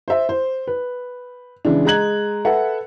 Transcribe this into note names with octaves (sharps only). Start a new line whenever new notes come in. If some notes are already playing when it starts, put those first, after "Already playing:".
C5 E5
C5
B4
C#3 E3 G#3 D4
G#3 D#5 A#5 F#6 G#6 F#7
A4 B4 E5 F#5